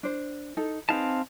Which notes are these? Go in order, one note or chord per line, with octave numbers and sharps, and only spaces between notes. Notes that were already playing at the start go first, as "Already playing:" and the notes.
D4 C5
D#4 A4
C4 D#4 G#4 B4 F5 A5